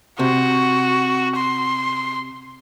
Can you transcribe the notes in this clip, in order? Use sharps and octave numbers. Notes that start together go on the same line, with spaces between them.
C3 F#4
C6